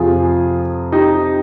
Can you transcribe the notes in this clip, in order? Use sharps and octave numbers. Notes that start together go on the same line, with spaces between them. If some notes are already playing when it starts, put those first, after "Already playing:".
Already playing: F2 C3 F3 F4 G#4
D#4 G4